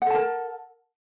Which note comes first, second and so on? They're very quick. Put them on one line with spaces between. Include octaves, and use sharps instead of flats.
F#5 A4 A5 A#4